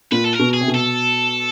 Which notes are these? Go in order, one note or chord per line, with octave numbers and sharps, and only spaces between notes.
A#2 B4
A4
A#4
B2
G#4
C3
B2
A4